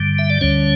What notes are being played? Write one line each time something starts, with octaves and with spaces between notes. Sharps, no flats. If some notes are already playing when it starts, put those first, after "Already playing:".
Already playing: G2 D3 G3
E5
D5
D2 D3 G3 C#4 C#5